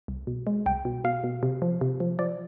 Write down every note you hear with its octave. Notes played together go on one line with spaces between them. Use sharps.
C2
B2
G#3
C2 G5
B2
B2 F5
B2
C3
F3
C3
F3
F3 D5